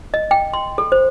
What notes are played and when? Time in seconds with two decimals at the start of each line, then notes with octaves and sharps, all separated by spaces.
0.14 D#5
0.31 G5
0.53 C6
0.78 A4
0.92 C5